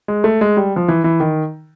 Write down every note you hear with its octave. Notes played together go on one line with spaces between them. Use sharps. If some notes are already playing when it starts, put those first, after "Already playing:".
G#3
A3
G#3
G3
F3
E3
E3
D#3